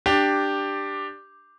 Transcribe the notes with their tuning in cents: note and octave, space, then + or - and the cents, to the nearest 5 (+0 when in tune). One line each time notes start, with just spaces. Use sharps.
D4 +10 G4 +0